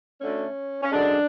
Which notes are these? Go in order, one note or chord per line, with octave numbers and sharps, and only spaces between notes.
D2 D3 A3 C#4
C#4
F#2 D3 G#3 D4